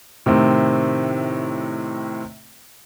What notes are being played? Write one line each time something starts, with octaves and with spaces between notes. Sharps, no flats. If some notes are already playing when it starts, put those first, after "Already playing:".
A2 C3 D#3 C4